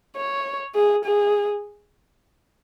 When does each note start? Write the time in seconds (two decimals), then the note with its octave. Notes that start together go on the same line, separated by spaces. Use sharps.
0.16 C#5
0.75 G#4
1.05 G#4